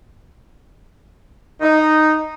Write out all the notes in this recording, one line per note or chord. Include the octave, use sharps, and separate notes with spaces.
D#4